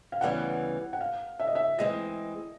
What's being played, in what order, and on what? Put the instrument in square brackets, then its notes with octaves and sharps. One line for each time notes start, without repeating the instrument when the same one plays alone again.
[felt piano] F5
[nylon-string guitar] D2 C#3 E3 G3 B3 [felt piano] F#5
[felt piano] F#5
F5
E5
D#5
E5
[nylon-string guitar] E3 G#3 C4 [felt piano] D#5